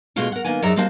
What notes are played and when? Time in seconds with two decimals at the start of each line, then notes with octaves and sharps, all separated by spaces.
0.16 B2 G#3 A3 F4 F#4
0.32 A#4 F#5
0.45 D#3 A#3 B3 G#5
0.62 F#2 D#4 G#4 D5 E5 A#5
0.76 G3 G#3 A#3 C4 F#4 A5